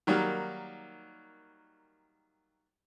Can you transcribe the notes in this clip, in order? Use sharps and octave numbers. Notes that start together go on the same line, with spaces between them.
D#3 F#3 G3 A#3